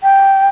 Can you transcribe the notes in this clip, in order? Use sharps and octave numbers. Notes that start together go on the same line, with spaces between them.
G5